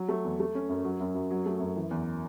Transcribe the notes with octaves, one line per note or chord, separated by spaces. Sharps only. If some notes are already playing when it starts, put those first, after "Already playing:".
Already playing: F#3
A3
E2
A3
C#4
F#2
F#3
F#2
F#2
F#3
A3
F#2
E3
E2